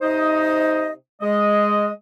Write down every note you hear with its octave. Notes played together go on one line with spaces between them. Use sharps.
C3 D#4 C5 D#5
G#3 D#5